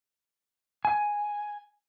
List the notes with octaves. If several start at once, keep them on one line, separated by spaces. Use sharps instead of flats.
G#5